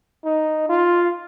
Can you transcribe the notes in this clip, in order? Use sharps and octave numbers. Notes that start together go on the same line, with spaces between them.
D#4
F4